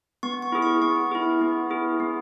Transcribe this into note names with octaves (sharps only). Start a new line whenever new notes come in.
B3 C#6
C#6
E4 G#4
C#6
B3 C#6
E4 G#4
B3
E4 G#4
B3